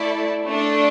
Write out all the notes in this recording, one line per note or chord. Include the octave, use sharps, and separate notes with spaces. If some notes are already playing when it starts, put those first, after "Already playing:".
Already playing: A3 E4 A4 D5
A3 D4 A4